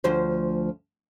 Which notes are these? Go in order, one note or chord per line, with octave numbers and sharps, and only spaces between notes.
D2 F3 C5